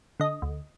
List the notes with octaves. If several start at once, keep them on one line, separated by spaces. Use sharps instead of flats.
D3 D#5
D2